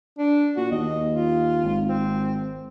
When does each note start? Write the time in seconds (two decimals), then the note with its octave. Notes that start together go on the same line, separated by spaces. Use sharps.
0.19 D4
0.57 A#2 F#4
0.72 D#2 D#5
1.13 F4
1.64 G#1
1.88 C4